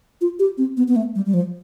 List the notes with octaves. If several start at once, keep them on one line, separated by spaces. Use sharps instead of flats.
F4
G4
C4
B3
B3
A3
G3
G3
F3